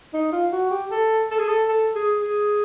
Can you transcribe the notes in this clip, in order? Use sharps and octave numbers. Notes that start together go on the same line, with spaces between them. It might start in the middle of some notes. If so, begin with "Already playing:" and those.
D#4
F4
F#4
G4
A4
A4
G#4
A4
A4
G#4
G#4